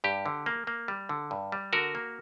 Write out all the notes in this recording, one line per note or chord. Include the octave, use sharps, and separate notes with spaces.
G2 G4
D3
A#3
A#3
G3
D3
G2
G3
D3 F#4 A#4
A#3